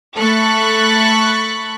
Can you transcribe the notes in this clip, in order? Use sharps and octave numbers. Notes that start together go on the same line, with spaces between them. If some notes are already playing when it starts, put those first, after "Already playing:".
A3 A4 B5 C#6 F#6 A6